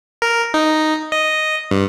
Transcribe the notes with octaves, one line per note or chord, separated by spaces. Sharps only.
A#4
D#4
D#5
G2